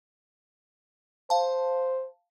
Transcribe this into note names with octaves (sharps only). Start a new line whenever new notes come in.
C5 F5 A5